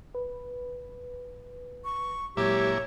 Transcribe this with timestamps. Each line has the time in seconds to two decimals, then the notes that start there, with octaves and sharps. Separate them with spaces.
0.15 B4
1.85 C#6
2.37 A#2 F#3 G#3 E4 G4 C#5